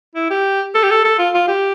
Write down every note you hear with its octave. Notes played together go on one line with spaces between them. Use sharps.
E4
G4
A4
G4
A4
A4
F4
F4
G4